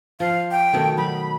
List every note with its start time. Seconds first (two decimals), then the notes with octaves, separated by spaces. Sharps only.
0.20 F3 F5
0.51 G5
0.73 B2 D#3 A3
0.97 F#3 D#4 B5